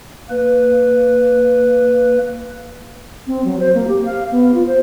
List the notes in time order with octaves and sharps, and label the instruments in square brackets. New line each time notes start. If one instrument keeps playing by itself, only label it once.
[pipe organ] A#3 B4
[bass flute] C4
F#3
C5
A#3
G4
F5
B3
F4
C5